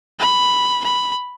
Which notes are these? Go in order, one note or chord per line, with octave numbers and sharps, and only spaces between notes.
B5
B5